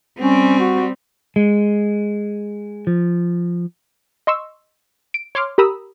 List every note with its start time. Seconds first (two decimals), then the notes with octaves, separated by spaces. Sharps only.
0.19 G3 C4 C#4
0.60 F#4
1.36 G#3
2.87 F3
4.27 D#5 C6 C#6 E6
5.14 D7
5.35 C#5 C6 D6 F6
5.58 G4 A#4 A#5 B5 D#6 E6